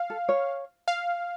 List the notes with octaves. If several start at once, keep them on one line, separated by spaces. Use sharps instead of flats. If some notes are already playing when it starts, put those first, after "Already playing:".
Already playing: F5
A4
C#5
F5